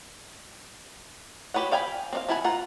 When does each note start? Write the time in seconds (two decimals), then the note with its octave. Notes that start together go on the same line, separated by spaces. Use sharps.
1.54 F#4 G4 B4 C#5 F#5
1.72 D5 F5 G5 G#5 B5
2.13 C4 D4 F5
2.28 F3 E4 F#5 G#5 B5
2.44 F4 F#5 A#5